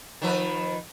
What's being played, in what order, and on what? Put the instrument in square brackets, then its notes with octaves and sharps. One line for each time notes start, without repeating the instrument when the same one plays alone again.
[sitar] D#3 F3 B4